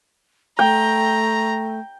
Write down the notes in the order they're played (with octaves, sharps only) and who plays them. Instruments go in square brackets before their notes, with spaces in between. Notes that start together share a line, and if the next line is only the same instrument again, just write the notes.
[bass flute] A3 [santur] G5 [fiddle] A#5